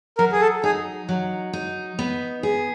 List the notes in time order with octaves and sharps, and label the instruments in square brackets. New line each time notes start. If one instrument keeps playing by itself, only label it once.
[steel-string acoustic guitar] F#3 [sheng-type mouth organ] A#4
[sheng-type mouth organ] G#4
A4
[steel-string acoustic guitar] D#4 [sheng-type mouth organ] G#4
[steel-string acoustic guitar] F#3
D#4
B3
G#4